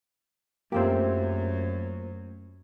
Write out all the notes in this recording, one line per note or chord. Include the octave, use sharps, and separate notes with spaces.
F#2 A3 A#3 C4 F4 G4 C5